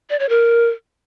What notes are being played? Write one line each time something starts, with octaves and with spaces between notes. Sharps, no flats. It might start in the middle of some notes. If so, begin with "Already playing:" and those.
D5
C#5
A#4